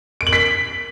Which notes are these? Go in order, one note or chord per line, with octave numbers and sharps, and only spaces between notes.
D7
F#7
B6